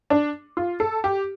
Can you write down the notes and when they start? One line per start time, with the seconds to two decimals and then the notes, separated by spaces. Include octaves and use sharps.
0.10 D4
0.57 F4
0.80 A4
1.04 G4